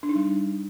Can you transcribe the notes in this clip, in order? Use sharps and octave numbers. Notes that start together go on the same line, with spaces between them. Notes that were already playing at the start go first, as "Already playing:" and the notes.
D4
D#4
G3